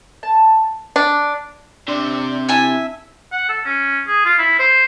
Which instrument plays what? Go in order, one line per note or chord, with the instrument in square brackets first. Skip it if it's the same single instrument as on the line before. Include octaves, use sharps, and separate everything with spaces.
[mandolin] A5
[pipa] D4
[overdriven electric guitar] C3 C5 [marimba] D4 [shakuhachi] D5
[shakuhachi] E4 [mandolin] E5 G#5 A5
[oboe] F#5
A4
C#4
G#4
F4
E4
C5